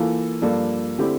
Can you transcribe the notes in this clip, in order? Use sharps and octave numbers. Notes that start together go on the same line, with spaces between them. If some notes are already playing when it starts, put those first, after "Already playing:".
Already playing: E3 A#3 F4 A4
G2 F3 A#3 D4 A4
D3 A3 C4 E4 G4